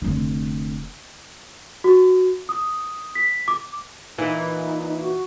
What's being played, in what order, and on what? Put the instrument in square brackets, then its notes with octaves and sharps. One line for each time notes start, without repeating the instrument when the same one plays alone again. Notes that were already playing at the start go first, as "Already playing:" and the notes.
[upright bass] F1 D3
[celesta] F#4
D#6
B6
D6
[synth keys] A#2 E3 [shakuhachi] D#4
[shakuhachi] F#4